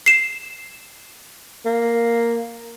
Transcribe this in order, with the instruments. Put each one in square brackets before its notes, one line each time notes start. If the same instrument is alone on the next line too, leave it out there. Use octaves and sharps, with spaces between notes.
[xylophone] C7 E7
[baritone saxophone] A#3